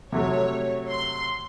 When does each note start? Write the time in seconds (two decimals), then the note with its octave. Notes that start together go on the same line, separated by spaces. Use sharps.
0.12 C3 F#3 A3 C#5
0.91 C6